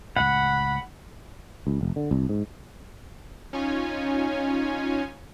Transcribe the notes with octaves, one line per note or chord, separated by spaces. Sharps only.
C#2 A2 F#5 B5
C#2
F1
D3
C2
G#2
C#4 D#4 F4 C#5 G#5